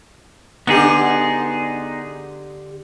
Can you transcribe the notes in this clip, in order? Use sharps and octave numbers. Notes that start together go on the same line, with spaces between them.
D3 B3 D#4 G4 G#4